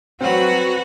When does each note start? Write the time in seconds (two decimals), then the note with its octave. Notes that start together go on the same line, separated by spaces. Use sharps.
0.21 F#3 C4 F#4 B4 C#5 F#5